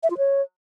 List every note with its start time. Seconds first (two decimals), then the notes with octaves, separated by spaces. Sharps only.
0.03 E5
0.10 F4
0.18 C#5